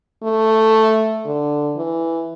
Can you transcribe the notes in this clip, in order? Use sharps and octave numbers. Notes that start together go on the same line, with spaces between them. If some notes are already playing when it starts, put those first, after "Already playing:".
A3
D3
E3